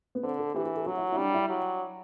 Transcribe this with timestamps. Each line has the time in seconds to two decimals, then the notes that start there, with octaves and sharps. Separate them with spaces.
0.15 B3
0.23 D3 C4
0.39 A4
0.55 E3 G4
0.65 G4
0.76 A4
0.86 F#3 F#4
0.97 E4
1.12 E4
1.18 G3 D4
1.34 E4
1.49 F#3